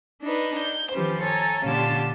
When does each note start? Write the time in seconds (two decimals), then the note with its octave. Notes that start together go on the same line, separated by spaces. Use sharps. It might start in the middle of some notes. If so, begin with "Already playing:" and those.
0.21 D4 D#4 B4
0.59 G6
0.91 D#3 F3 C#4 G4 B4 C5
1.22 A4 C#5 G#5 A#5
1.64 A#2 D3 C#4 G4 F5 A5